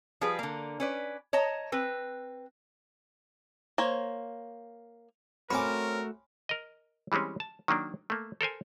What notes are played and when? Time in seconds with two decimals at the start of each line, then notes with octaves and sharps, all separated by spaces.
0.21 F3 G3 G#4 B4
0.39 D3 A#3
0.80 C#4 B4 D5
1.33 C#5 D#5 A5 A#5
1.72 C4 B4
3.78 A#3 C5 C#5
5.50 A3 C4 C#4 F#4 A#4 G#5 B5 D6
6.49 A#4 D#5
7.12 E3 G3 G#3 C4 C#4
7.40 A5
7.68 D#3 F#3 A#3 D4
8.10 A3 A#3
8.41 A4 A#4 C5 G#5